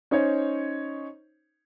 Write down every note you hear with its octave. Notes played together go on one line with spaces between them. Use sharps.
C#4 D#4 C5 C#5